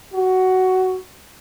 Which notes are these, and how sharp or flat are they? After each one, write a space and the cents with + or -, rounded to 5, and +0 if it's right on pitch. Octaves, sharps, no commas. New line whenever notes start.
F#4 +10